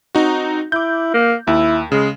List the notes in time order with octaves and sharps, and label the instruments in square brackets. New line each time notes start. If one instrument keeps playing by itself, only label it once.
[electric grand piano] C4 D#4 F#4
[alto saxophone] E4 [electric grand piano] D6 G6
[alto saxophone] A#3
[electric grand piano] D#2 [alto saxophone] E4
[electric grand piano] C#3 [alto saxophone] G#3